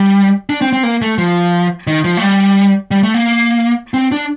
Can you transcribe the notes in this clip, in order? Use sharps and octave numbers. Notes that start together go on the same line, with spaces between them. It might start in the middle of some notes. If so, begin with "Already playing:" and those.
Already playing: G3
D4
C4
C4
A#3
A3
F3
D#3
F3
A3
G3
G3
A3
A#3
C4
D4